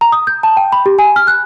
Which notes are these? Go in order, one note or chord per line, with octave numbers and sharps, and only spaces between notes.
A#5
D#6
G6
A5
G5
B5
G4
G#5
F6
F#6